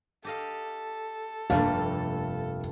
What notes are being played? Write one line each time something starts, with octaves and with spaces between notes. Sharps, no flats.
G4 A4 D#5 F5
F1 G2 A3 A#3 F5